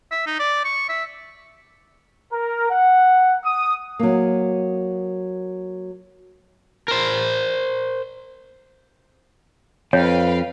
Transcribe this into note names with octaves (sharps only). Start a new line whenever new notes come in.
E5
D#4
D5
C#6
E5
A#4
F#5
D#6
F#3 A#3
A#4 C5
F2 B4 C#5 F5 G5